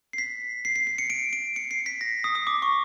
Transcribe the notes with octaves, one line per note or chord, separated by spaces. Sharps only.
C7
B6
C7
C7
C7
C#7
D7
D7
C#7
C7
B6
A#6
D#6
D#6
D6
C#6